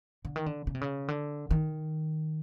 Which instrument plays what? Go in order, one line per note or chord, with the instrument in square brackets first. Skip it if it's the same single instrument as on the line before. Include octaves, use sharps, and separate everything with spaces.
[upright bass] D3
D#3
D3
C#3
C3
C#3
D3
D#3